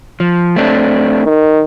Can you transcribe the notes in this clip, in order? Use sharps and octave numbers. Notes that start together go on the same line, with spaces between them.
F3
A3 C4 D4
D#3